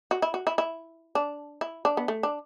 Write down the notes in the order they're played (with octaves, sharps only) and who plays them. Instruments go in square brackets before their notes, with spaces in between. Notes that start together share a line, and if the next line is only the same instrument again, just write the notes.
[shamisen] F#4
E4
F#4
E4
E4
D4
E4
D4
B3
A3
D4